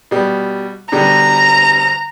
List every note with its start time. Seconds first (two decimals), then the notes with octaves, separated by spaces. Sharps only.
0.11 B2 G3
0.92 B2 D3 G3 A#5